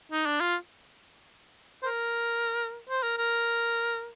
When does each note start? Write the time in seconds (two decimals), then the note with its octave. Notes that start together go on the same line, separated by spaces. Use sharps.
0.12 D#4
0.26 D4
0.40 F4
1.82 C5
1.86 A#4
2.89 C5
3.03 A#4
3.18 A#4